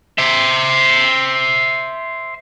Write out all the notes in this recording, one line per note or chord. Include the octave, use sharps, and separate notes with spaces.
C5 E5